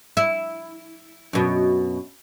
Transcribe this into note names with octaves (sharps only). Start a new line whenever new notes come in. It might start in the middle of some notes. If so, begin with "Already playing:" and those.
E4
F#2 B2